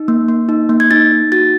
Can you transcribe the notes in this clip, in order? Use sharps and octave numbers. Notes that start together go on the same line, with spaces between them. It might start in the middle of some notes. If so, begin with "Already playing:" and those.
Already playing: D#4
A#3
A#3
D#4
A#3
G#6
D#4 A6
D#4
F#4 A6